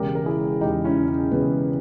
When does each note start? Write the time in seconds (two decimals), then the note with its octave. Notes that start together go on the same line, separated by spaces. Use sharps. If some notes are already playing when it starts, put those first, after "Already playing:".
Already playing: E1 E2 C#3 G#3 G4 A#4
0.15 A#4
0.26 E4 G#4
0.61 E1 E2 C#3 G#3 D#4 G4
0.84 C#4 E4
1.07 C#4
1.31 E1 E2 C#3 G#3 B3